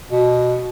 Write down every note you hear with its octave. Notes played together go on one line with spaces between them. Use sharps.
B2